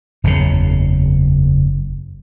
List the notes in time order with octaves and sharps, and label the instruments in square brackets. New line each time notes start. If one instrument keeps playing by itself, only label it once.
[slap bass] F#1 E2 A2 C#3